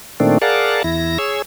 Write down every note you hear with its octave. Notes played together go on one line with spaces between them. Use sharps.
A#2 D#3 A3 C4 D4
G#4 A#4 D5 F5 F#5 A5
E2 E4 A#6
G#4 C#5 E6